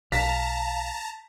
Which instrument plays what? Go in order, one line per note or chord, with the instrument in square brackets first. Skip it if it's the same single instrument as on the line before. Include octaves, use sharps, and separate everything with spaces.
[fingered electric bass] B1 [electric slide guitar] F5 [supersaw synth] A5 A#5 [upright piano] B6